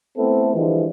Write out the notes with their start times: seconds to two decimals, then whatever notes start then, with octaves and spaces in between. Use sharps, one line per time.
0.17 A3 B3 C4 E4 A4
0.54 D3 E3 F3 G3 G#3